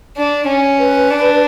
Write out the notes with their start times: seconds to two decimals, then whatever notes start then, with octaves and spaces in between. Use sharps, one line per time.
0.17 D4
0.47 C#4
0.79 B4
1.10 D4